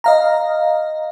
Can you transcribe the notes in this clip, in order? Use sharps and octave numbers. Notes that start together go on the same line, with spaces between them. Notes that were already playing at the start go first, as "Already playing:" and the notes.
D#5 F5 A#5